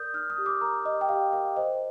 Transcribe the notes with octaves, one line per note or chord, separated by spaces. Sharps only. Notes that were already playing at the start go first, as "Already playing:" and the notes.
Already playing: A#4 D5 D#6 G6
D#4 F6
D#6
G4
D6
A#4 A#5
G4 D#5
G5
G4 F5
A#4 F5
C5 D#5